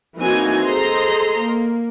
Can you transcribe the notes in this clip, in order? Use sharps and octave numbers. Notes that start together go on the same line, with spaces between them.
E3 A#3 C4 D#4 F#4 G#5
G#4 A4 C5 D#5 A#5 C6
A#3